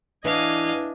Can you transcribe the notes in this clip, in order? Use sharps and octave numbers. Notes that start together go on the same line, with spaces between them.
E3 D4 D#5 F5 G#5